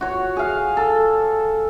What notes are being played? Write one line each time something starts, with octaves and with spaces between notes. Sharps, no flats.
F#4 C#5
G#4 F5
A4